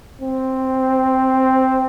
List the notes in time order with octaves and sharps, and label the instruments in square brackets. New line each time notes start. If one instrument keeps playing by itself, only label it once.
[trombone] C4